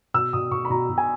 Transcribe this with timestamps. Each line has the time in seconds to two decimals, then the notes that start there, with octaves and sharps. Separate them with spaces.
0.14 B2 E6
0.33 B2 D#6
0.51 B2 C#6
0.65 B5
0.70 B2 A#5
0.89 B2
0.98 G#5